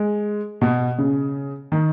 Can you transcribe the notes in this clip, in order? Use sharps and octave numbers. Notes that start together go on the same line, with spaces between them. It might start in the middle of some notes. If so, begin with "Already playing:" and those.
Already playing: G#3
B2
C#3
D#3